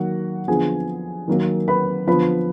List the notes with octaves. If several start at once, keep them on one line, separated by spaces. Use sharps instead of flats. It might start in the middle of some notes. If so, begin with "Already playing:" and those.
Already playing: D#3 F#3 A#3 F#4 F#5
D3 F3 B3 G#4 G#5
D#3 F#3 A#3
B4 B5
D3 F3 B3 B4 B5